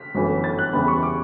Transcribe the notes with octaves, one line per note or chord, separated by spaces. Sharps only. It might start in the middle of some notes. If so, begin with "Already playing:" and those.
Already playing: B6
G1 F#2 E3 A3
A6
F#6
E2 C#3 E3 G3 B3 B5
C#6
D6